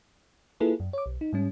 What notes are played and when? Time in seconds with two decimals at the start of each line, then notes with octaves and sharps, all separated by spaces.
0.60 A#3 E4 F4 G#4 A4 B4
0.80 F#2
0.93 C#5 D6
1.06 B1
1.21 D#4
1.33 G#2 G3 C#4